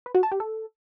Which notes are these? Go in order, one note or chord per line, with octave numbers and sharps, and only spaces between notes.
B4
F#4
A5
G4
A4